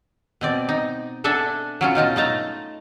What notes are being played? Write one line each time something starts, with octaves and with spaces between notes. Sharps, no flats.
B2 C4 D5
D#4
D4 A4 E5 F#5 G#5 A5
F#3 C#4 F4
B2 D#4 F4 A5
A3 D#4 A5 A#5